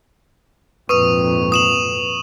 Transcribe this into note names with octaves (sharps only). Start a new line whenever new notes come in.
G#1 F2 A#2 B4 C#6 D#6 D#7
D#6 E7 F#7